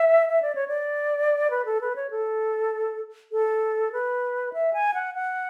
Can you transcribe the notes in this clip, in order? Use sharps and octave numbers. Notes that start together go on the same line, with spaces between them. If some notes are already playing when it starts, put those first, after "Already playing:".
Already playing: E5
E5
D5
C#5
D5
B4
A4
B4
C#5
A4
A4
B4
E5
G#5
F#5
F#5